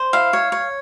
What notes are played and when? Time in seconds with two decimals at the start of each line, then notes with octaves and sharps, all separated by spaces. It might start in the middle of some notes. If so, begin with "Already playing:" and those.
Already playing: C5
0.13 E4 F5
0.33 C#5
0.52 C#5